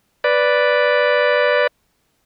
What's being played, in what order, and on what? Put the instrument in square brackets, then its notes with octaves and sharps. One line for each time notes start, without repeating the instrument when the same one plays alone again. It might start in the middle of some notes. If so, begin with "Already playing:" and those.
[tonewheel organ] B4 D5